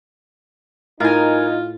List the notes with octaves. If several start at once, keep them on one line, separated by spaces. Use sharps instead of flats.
A2 D#4 F4 A#4 G#5